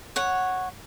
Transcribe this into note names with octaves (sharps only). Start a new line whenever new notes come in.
C#5 F#5